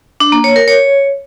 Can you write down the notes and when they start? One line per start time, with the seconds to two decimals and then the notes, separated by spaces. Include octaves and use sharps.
0.20 D4
0.32 A#3
0.44 C#5
0.56 A#4
0.68 C#5